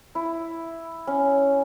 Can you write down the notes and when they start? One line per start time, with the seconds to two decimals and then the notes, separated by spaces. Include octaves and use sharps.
0.15 E4
1.07 C#4